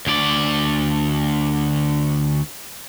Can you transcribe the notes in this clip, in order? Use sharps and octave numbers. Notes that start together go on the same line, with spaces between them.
D2 D5